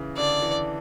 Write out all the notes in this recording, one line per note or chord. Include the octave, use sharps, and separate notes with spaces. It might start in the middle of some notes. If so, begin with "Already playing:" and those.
Already playing: C#3 E3
D3 D5
E3